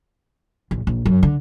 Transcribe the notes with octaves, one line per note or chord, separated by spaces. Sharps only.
A#1
A#1
F#2
D3